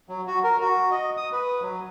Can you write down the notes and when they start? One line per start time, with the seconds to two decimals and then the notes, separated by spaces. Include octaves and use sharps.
0.09 F#3
0.27 F#4
0.44 A#4
0.61 F#4
0.91 D#5
1.17 D#6
1.32 B4
1.62 F#3